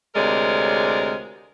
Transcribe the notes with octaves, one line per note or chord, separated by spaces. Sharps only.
D2 C3 G#3 A#4 C#5 D5